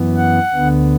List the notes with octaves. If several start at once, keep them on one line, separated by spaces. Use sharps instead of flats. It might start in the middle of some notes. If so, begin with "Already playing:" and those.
Already playing: F#2 E3 B3
F#5
D2 D3 B3